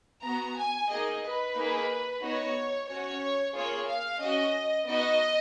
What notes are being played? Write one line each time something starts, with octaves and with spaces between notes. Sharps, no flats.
B3 F#4 A#5
G#5
A#3 D#4 G#4 D#5
B4
A#3 D#4 G#4
B3 D#4 F#4 C#5
C#4 F#4 C#5
A#3 F4 G#4 C#5
F5
C#4 F#4 D#5
B3 D#4 F#4 D#5